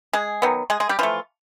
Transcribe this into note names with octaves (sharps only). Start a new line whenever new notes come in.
G#3 G#4
D#3 F#3 B3
G#3 G#4
G#3 G#4
G3 G4
E3 F3 A3 F4